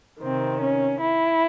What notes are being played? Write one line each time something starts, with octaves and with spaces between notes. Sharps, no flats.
C3 D#3 C4
C#4
E4